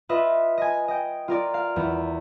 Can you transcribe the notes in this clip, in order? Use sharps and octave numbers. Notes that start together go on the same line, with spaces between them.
F4 B4 D#5 E5
D#5 G#5
D#5 G5
F4 A#4 D5
F5
E2